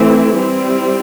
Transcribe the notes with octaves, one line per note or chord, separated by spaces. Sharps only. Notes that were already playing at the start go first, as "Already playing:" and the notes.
Already playing: E3 A3 C4 E4
G3 C4 E4